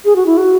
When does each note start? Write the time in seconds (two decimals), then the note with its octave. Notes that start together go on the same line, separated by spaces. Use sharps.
0.05 G#4
0.16 F#4
0.26 E4
0.37 F#4